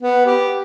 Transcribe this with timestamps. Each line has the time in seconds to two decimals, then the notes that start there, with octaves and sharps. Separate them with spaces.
0.02 B3
0.26 G4